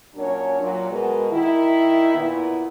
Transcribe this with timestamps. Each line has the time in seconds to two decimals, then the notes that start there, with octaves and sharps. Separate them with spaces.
0.16 A#2 F#3 C#4 D4 A#4 C#5
0.59 A#2 F#3
0.90 B2 G#3 A#4
1.30 D#3 E4
2.15 A#2 B3 E4